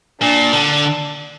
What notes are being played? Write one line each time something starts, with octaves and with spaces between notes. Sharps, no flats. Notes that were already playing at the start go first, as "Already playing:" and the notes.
A#2 D4
D3